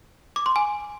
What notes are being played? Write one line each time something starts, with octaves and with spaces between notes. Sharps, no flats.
D6
C6
G#5